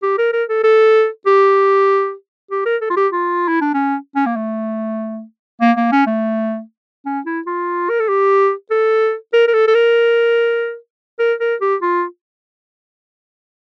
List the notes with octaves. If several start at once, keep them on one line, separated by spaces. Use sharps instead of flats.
G4
A#4
A#4
A4
A4
G4
G4
A#4
A4
F4
G4
F4
E4
D4
C#4
C#4
A#3
A3
A#3
A#3
C#4
A3
C#4
E4
F4
A#4
A4
G4
A4
A#4
A#4
A4
A4
A#4
A#4
A#4
G4
F4